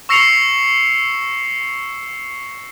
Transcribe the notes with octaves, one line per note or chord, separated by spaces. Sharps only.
C#6 E6 A#6 C7 C#7 F7